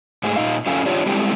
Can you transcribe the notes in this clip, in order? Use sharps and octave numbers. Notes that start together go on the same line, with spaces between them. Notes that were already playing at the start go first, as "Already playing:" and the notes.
G#2 A3 G#4
A#2 D#4 D#5 F5
F#2 F3 C#4 A4 F5 G#5
D4 F4 G4 C#5
G3 G#3 C4 E4 G4 A4